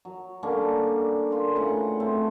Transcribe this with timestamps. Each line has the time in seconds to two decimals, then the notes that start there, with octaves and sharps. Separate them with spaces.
0.05 F#3
0.43 D3 G3 A#3 C#4
1.31 F4 A#4
1.56 A2 C#3 B4 F#5
2.00 A2 A3 C4